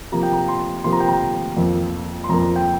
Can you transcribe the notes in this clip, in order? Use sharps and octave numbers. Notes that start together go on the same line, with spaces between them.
C3 F3 A#3 A#5
G5
A#5
C6
C3 F3 A#3 C6
A#5
G5
A#5
F2 F3 A#3
C6
F2 F3 A#3 A#5
G5